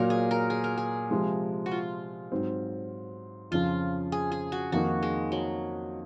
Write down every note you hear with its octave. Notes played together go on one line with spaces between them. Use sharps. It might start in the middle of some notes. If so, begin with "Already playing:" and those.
Already playing: A#2 F#3 A#3 A#4
G#4
A#4
G#4
A#4
G#4
C3 F3 G#3
F#4
F4
G#2 F#3 C4
F2 C#3 F3 F4
G#4
G#4
F#4
F2 D#3 A#3 D#4 F#4
G#3
F#3